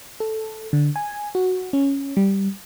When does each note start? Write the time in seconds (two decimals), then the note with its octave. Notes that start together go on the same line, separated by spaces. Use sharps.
0.20 A4
0.73 D3
0.96 G#5
1.35 F#4
1.73 C#4
2.17 G3